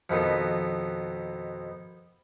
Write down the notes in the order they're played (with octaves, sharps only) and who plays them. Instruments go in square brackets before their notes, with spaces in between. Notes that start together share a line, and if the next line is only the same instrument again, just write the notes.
[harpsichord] F2 B2 D#3 B3